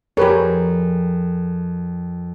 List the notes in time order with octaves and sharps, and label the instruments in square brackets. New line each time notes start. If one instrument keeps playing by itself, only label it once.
[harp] F2 [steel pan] G4 B4 C#5 [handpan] G#4 A#4